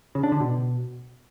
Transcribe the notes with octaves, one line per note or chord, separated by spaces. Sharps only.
C#3
D4
D3
B2